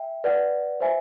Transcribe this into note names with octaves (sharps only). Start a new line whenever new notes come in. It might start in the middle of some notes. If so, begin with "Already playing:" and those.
Already playing: E5 G5
B4 D5 F#5
C5 E5 G#5